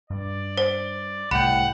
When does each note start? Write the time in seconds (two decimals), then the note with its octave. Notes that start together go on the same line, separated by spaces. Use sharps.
0.10 G2 D5
0.57 C5
1.31 C2 A2 F#5 G5 B5